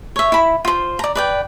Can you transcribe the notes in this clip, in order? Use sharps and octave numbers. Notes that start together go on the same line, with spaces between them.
C#5 E5
E4 B5
F4 C5
D5 A#5
B4 D5 G5